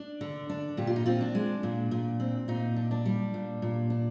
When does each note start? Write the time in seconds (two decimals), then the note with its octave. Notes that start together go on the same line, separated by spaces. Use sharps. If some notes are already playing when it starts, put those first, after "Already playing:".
Already playing: D4
0.21 D3
0.49 D4
0.77 A#2 G4
0.87 F4
0.96 D#4
1.06 C4 F4
1.21 D4
1.35 G#3
1.63 A#2
1.91 A#2
2.20 C4
2.48 A#2 D#4
2.76 D4
2.91 D4
3.05 G3
3.34 A#2
3.62 A#2
3.90 D4